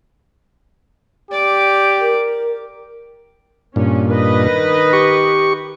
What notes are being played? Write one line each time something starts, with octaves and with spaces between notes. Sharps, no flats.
G4 D5 D6
A#4
G2 A#2 C#4
D#3 B4 D#5
G4 C#6